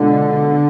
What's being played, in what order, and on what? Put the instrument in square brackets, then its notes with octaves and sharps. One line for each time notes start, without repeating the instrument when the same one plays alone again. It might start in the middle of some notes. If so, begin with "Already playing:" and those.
Already playing: [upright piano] B2 G#3 D4 F4 [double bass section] D3